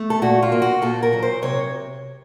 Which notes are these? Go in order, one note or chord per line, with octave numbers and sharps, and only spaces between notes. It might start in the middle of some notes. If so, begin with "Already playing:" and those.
Already playing: A3
A4
A#2 F#4
F4
A#3
F#4
A#2 A4
A#4
F#3
C5
C3 C#5